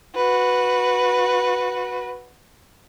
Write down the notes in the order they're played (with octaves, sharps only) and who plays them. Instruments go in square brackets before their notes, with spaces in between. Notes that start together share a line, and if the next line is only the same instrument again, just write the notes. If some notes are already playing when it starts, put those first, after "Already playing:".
[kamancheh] F#4 B4